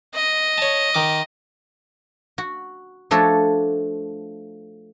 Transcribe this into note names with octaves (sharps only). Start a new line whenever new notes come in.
D#5
C#5 A5
D#3 D6
F#4
F3 A3 D4 F#4 A4 C#5